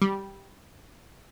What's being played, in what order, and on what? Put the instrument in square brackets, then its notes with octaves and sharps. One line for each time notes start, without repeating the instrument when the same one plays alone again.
[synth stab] G3